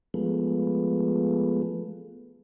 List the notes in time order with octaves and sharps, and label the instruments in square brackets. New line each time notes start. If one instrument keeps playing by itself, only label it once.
[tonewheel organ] F3 G#3 A3 B3